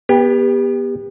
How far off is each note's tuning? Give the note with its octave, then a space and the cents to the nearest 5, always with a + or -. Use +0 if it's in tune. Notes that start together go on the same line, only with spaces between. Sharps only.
B3 -25 G4 +25